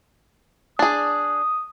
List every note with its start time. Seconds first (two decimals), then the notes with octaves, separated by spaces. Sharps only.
0.79 D4 G#4 D#6